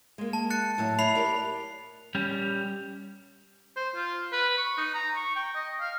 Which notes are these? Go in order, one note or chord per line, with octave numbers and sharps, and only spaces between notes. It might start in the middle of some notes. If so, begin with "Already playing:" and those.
G#3 A#3
A5
F#6 A6 C#7
A2 F#3 A5
E4 C#5 B5 C7 F7
G4 A#4 D5
G3 C#4
C5
F4
B4
C#6
D#4
A#5
C#6
G5
D#5
F5